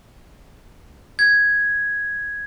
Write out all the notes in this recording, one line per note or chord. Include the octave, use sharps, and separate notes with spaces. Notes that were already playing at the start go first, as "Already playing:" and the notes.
G#6